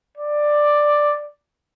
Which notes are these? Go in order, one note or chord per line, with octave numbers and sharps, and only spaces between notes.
D5